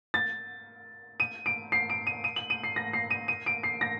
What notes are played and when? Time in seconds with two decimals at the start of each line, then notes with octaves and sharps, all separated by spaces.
0.14 A6
1.20 D#7
1.46 D7
1.72 C7
1.90 D7
2.07 D#7
2.24 D#7
2.36 F#7
2.50 D#7
2.64 C7
2.76 A#6
2.93 C7
3.10 D#7
3.28 D#7
3.46 D7
3.63 C7
3.81 A#6